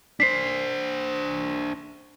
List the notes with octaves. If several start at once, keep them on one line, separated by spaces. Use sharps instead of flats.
D4 C5 B6 C7